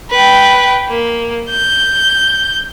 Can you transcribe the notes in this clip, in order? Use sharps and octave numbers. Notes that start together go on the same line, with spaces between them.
B4 G5
A#3
G6